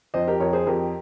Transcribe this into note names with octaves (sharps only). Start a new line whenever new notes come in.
F2 C5 D#5
G4 A#4
F2 A#4 C#5
G#4 C5
F2 G4 A#4